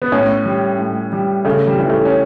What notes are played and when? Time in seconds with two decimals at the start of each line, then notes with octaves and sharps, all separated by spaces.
0.02 B3
0.12 A2 C#4
0.45 G3
0.79 A2
1.12 G3
1.45 C#3 A3
1.67 G3
1.79 E3 G3
1.89 A3
2.05 C#4